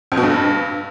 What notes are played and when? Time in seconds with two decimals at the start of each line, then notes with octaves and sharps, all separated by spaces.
0.12 F2
0.17 B2
0.23 G2